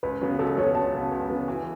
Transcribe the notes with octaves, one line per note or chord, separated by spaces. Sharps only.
C#2 B4
C#3 F#3 B3
C#2 A4
C#3 F#3 B3 C#5
C#2 A5
C#3 F#3 B3
C#2
C#3 F#3 B3
E3